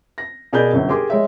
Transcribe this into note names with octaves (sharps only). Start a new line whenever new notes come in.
A#6
B2 G#4 A#4 D5 B5 G6
G1 F#2
G4 G#4 A#4 C6 D6
G#3 C#5 E5